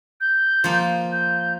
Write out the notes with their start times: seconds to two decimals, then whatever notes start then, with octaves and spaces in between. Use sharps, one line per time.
0.21 G6
0.64 F3 A#3
1.12 G6